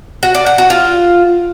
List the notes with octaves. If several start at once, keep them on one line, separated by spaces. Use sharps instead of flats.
F#4
D5
F#5
F#4
F4